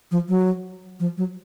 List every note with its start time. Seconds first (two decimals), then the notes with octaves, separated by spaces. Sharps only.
0.11 F3
0.28 F#3
1.00 F3
1.17 F#3